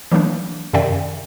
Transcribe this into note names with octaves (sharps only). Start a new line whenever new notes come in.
E3 F#3 A3 A#3 D4
F#2 C3 D#3 D5 E5 G5